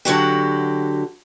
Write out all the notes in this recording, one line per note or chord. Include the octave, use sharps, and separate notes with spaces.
D3 F#3 F#4 G4